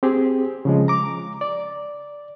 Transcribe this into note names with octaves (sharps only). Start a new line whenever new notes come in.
C4 G4 G#4
C#3 F3 G#3
A#5 D6
D5